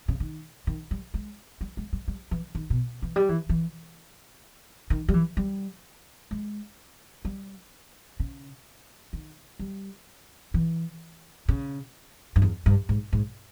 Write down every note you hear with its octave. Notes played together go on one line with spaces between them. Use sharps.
C#3
D#3
D#3
G3
G#3
G3
G#3
G3
G3
E3
D#3
B2
E3
G3
E3
E3
D#3
G3
E3
G3
G#3
G3
C#3
D#3
G3
E3
C#3
G2
E2
G2
G#2
G#2